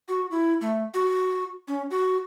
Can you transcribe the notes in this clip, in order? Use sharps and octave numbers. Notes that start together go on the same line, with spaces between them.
F#4
E4
A3
F#4
C#4
F#4